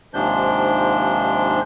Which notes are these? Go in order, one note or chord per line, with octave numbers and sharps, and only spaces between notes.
D#2 G#2 C3 F3 D4 G6